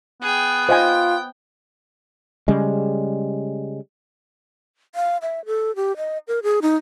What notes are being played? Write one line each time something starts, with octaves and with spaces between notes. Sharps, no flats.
B3 G#4 G5
F4 C5 D#5 G5 G#5
C#3 G3 G#3
F5
E5
A4
G4
D#5
A#4
G#4
D#4